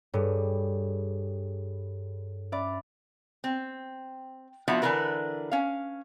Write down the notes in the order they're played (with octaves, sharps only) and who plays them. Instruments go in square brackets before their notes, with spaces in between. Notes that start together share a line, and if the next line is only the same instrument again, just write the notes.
[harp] G2 [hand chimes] G#4 A4 C#5
[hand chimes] C#4 E5 B5 [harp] D5
[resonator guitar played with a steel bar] C4
F3 B3 D4 E4 F#4
D3 E3 D4 F4 A#4 B4
C#4 F5